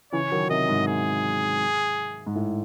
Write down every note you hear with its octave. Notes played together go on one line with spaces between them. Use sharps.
C#3 E3 C#5
D#3 F#3
C3 D#3 D#5
G#2
G#4
G#2
A2